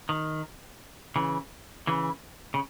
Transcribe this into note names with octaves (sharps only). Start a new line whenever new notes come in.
D#3
C#3 E3
C#3 E3
C#3